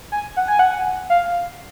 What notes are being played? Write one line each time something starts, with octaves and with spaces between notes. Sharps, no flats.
G#5
F#5
G#5
F#5
F5